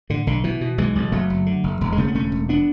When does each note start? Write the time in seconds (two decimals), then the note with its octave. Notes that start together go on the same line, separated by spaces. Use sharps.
0.10 A2 D3
0.27 B1 D3
0.44 B2 E3
0.61 B2
0.78 B1 E3 G#3
0.95 B1
1.12 F#1 F#3 A3
1.30 F#1
1.46 D3
1.64 F#1
1.81 E1
1.92 G#3
1.98 C#3 A3
2.08 B3
2.15 E1 A3 C#4
2.32 E1
2.49 B3 D4